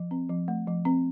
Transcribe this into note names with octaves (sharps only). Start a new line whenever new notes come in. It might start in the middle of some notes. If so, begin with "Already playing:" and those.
Already playing: F3
C4
F3
A3
F3
C4